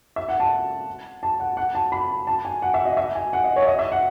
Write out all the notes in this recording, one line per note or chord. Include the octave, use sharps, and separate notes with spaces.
E5
F#5
A5
A5
F#5
F#5
A5
B5
A5
G#5
F#5
E5
D#5
E5
G#5
F#5
D#5
C#5
E5
D#5
E5
F#5